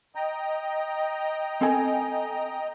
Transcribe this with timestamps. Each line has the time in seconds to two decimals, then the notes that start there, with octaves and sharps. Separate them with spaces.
0.15 D#5 G5 A#5
1.61 C4 A4 G#5